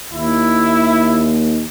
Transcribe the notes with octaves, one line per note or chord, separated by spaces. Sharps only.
D#2 E4